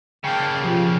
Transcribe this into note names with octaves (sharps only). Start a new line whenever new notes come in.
C#3 A#3 G5 A5
B2 F3 G4